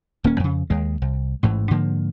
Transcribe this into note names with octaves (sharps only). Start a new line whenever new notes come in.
D#1 A#3 C#4
F2 C#3
D#2 G#3
C2
A1 G#2 E3
G#2 D3 F3 A#3